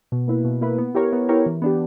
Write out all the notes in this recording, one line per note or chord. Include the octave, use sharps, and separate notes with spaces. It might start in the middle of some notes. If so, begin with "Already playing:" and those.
B2
A#3 E4 B4
B2
A#3 E4 B4
B3
E4 G4 A#4 C#5
B3
E4 G4 A#4 C#5
E3
B3 D4 G4